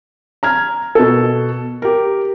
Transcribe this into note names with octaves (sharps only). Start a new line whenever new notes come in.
A#5 F6 G#6
B2 A4
G4 A#4